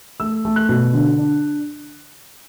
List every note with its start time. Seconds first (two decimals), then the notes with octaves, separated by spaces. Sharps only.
0.20 A3 E6
0.45 A3
0.56 F#6
0.69 B2
0.93 D3
1.18 D4